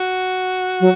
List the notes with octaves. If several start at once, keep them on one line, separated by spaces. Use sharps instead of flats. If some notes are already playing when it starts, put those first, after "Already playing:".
Already playing: F#4
F#3